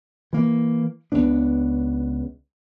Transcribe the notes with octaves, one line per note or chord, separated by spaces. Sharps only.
E3 A#3
C#2 C#3 B3 D4